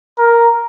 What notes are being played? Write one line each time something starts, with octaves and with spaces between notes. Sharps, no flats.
A#4